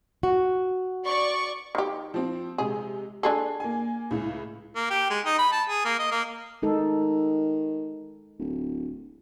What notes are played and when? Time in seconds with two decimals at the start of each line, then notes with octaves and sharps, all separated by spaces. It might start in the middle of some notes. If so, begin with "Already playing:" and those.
0.23 F#4
1.04 D5 C#6
1.75 D#3 G4
2.14 F3 C4
2.58 C3 G#3 G#4
3.23 D4 G#4 A4 C7
3.60 A#3 G#5
4.11 C#2 A2
4.76 A#3
4.90 G4
5.10 G#3
5.25 D#4
5.39 B5
5.52 A5
5.69 G#4
5.85 A#3
5.99 D#5
6.12 A#3
6.62 D#3 G#3 D#4 A4
8.39 D1